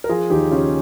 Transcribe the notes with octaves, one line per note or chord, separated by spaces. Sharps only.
A#4
F3 F4 G#4
D#2 D#4 G4
C#3 C#4 F4